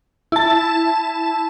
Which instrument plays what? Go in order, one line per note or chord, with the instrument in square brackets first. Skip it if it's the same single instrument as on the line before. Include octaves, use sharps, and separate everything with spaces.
[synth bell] E4 A5